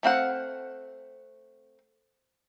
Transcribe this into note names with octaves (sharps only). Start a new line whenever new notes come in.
A3 C4 F5 F#5